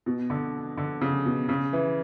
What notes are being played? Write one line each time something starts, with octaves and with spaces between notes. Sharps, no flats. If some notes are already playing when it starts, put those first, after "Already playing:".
B2
D3
D3
C#3
B2
C#3
E3